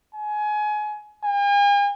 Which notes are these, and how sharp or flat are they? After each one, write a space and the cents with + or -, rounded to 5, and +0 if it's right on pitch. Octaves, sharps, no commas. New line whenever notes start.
G#5 +25
G#5 -45